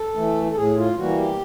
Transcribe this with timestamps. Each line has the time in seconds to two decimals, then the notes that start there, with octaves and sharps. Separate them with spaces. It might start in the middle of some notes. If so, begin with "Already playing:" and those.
Already playing: A4
0.15 E3 A3
0.51 A4
0.56 A2 G#4
0.77 F4
0.97 E3 G3 A#3 F#4
1.18 G4